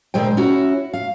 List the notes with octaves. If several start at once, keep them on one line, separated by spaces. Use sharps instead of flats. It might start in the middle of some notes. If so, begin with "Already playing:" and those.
D2 A#2 G#3 C5 G5
C#4 E4 F#4
F5